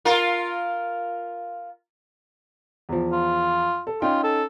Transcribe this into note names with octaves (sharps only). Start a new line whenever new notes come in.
F4 A#4
E2 F3
F4
A4
C#4 D#4 F4 G5
A4